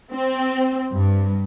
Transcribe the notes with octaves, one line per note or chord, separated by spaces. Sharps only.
C4
G2